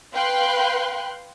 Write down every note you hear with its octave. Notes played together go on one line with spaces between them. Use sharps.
B4 F5 G5 C6 F#6